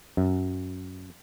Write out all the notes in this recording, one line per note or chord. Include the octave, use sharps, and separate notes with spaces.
F#2